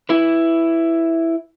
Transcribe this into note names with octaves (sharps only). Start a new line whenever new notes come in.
E4 B4